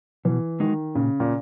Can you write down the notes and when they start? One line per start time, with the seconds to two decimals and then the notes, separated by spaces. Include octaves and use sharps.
0.25 B2 E3
0.60 D#3 G#3 D#4 F#4
0.95 A#2 C#3
1.20 A#2